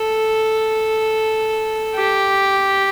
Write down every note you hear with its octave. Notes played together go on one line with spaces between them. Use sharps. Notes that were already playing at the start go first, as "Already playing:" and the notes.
Already playing: A4
G4